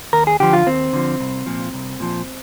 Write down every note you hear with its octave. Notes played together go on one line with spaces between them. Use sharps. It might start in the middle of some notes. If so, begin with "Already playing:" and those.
D#2 A#4
G#4
D3 F3 G4
F4
D#2 C4
D3 F3
C2
A#2 F3
C2
A#2 F3